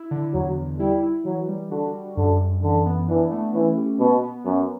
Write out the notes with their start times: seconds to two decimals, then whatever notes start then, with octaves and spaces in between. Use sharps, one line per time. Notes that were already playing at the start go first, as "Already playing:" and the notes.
Already playing: E4
0.11 D3
0.33 E2 F#3
0.57 E2
0.80 G3 E4
1.03 E4
1.25 E3 F#3
1.48 G3
1.71 D3 F#4
1.94 G3
2.17 F#2 D3
2.40 F#2
2.63 D3 E3
2.86 B3
3.09 E3 D4
3.31 A3
3.54 E3 C#4
3.78 G4
4.00 B2 B3
4.23 B3
4.45 F#2 B3